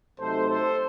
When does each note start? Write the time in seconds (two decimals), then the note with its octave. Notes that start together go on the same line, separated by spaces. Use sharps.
0.20 C3 F#3 A3 D#4 A4 C5
0.48 A4 C5